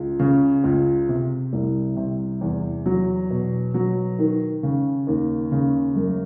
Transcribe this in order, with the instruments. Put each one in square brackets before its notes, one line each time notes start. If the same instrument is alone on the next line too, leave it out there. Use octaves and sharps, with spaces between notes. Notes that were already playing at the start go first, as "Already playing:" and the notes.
Already playing: [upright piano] C#2
C#3
C#2
C3
C2
C3
E2
F#3
B2
F#3
D#3
C#3
D#2
C#3
F#2